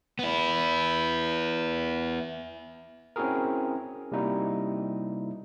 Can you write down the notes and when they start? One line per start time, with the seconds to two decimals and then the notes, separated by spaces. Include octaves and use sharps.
0.19 B3 E4
3.16 C4 C#4 E4 F#4 G#4 A#4
4.12 C3 G3 A#3 D#4 E4 F#4